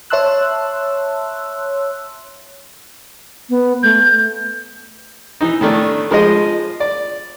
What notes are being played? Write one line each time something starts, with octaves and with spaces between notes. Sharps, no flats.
C#5 E5 A5 C6 E6 F#6
B3
A3 G6
E3 D#4
A2 D#3 A3 D4
F3 G#3 G#4 D#5
D5